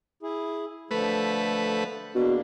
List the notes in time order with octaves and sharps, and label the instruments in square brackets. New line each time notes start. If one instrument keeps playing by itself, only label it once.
[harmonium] E4 G#4
[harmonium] D3 F3 [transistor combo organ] A3 B4
[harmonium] E2 A#3 D4 [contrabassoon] B2